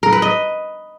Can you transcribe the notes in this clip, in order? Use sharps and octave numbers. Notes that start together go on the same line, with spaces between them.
A#4
B4
D#5